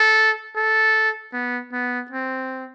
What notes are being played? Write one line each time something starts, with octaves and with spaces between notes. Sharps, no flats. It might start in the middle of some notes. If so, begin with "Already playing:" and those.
Already playing: A4
A4
B3
B3
C4